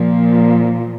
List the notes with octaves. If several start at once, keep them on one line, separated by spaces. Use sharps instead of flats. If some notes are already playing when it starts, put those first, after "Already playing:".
Already playing: A#2 F3